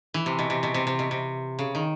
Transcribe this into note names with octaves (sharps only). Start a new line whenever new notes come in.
E3
C3
B2
C3
B2
C3
C3
B2
C3
C#3
D#3